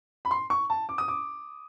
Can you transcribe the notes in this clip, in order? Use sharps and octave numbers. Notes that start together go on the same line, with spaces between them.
B5
C6
C#6
A5
D6
D#6
D6